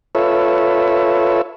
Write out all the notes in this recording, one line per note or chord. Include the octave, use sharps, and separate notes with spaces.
F4 A4 B4 C#5 E5